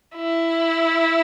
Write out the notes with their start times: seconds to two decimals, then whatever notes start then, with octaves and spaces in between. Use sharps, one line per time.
0.16 E4